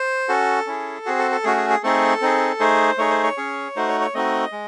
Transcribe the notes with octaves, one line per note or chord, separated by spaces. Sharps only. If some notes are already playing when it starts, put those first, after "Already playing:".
Already playing: C5
C#4 F#4 A4
C#4 E4 G#4
C4 F#4 G#4
A4
A4
A3 C#4 F#4 G#4
G#4
G#4
A3 C4 D#4 G#4 A4
C4 D#4 G#4
A3 D#4 G#4 C5
A3 D#4 G#4 C#5
C5
C#5
C#4 G#4
A3 D#4 F#4 C5
C#5
C#5
A3 C4 D#4 F#4 D#5
G#3